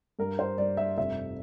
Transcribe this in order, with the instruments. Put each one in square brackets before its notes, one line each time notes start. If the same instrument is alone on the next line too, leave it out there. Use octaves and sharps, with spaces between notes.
[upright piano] G2 A#4
C5
G2 D5
E5
F1 E5